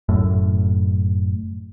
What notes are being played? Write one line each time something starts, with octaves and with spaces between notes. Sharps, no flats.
F#1 F#2 A2